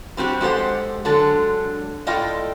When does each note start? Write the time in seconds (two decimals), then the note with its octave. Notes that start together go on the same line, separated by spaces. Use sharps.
0.17 G3 C4 F#4 G4
0.41 G#3 G4 A4 C5 F#5
1.05 D3 F#3 G#3 A4
2.07 A2 F4 A4 D5 D#5 G5